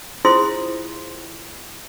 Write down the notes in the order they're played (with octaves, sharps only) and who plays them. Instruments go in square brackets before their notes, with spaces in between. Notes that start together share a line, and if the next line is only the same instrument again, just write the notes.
[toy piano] E4 F4 G#4 C5 C6 D#6